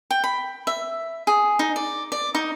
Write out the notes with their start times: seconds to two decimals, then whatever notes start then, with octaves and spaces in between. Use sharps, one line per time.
0.11 G5
0.24 B5
0.67 E5
1.27 G#4
1.59 D#4
1.76 D5
2.12 D5
2.35 D#4